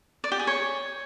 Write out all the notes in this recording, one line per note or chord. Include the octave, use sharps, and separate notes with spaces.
D5
G4
G#4
C#5